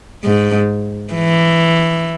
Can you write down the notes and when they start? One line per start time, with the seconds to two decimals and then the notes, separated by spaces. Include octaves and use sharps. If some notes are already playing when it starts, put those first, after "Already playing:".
0.24 G#2
1.14 E3